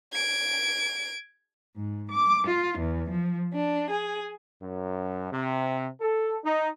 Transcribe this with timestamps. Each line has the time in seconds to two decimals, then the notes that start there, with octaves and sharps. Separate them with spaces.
0.12 G#6 D7
1.76 G#2
2.10 D6
2.46 F4
2.78 E2
3.10 F3
3.52 D4
3.88 G#4
4.62 F#2
5.32 C3
6.00 A4
6.44 D#4